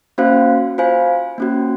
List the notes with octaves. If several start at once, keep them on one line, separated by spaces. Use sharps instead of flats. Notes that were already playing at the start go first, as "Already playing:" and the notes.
A#3 C#4 F#4 C5 F5
F4 C5 F5 G#5
A#3 C#4 F#4